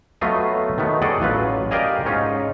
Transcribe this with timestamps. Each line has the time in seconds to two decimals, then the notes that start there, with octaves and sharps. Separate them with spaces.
0.21 F#3 A3 B3 F4 D#5 F5
0.78 D#3 F#3 A3 B3
1.02 G#4 A4 D5 D#5 F#5
1.20 A1 F#3 F4 B4
1.71 G4 A#4 D5 D#5 F5 G#5
2.05 G#2 C#4 D#4 F4